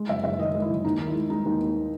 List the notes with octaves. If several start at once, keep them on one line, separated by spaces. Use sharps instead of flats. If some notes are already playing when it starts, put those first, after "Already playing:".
Already playing: G#3
F#1 E5
F#1 E5
D#3 D#5
G#3
E4
F#1
D#2 D#4
D#3
E4
G#3
G#3 D#4
D#2
D#2